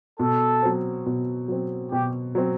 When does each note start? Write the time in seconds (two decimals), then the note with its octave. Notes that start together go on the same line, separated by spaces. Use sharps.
0.19 B2 A4
0.63 F#3 C4
1.06 B2
1.48 F#3 C4
1.92 B2 G4
2.35 F#3 C4